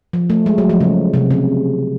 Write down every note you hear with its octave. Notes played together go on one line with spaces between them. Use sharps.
F3
A3
G#3
F#3
F3
C#3
C3
C#3